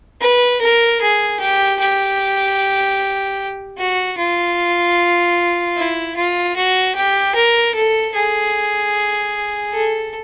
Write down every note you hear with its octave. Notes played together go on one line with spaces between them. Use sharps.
B4
A#4
G#4
G4
G4
F#4
F4
E4
F4
F#4
G4
A#4
A4
G#4
A4